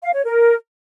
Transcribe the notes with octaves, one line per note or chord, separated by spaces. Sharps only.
F5
C#5
A#4